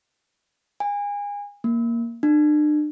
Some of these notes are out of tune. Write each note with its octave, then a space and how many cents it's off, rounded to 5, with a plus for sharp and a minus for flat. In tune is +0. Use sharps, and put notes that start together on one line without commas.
G#5 -30
A#3 +0
D4 +40